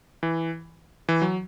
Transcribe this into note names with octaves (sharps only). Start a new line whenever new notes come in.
E3
E3
F#3